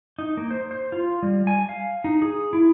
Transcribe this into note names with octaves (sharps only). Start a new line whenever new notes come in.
D#4
A#3
C5
C5
F4
G3
G#5
F5
D#4
G#4
E4